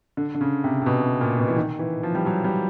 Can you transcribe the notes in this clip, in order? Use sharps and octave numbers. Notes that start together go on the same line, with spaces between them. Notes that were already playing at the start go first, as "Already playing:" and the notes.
D3
D3
C#3
C3
C3
B2
C3
A#2
B2
E3
D#3
E3
F3
G3
F#3
G3